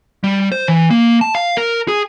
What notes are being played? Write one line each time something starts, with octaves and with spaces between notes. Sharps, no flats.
G3
C5
E3
A#3
A5
F5
A#4
G#4